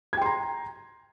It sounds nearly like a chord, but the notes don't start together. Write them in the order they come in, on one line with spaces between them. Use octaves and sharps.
G#6 G5 C6 A#5